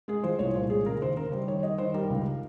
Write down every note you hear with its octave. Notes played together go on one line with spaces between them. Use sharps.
G#3 G#4
F3 C5
C2 C#5
A#2 C5
G#3 G#4
C#3 A#4
D#2 C5
C#3 A#4
G3 C5
D#3 C#5
G3 D#5
D#3 C5
G3 A#4
C#2